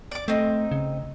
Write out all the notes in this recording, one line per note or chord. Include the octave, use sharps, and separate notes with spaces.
D5 D6
A3 C4 D#4
C#3